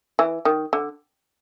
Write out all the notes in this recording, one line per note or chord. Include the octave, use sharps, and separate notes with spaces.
E3
D#3
D3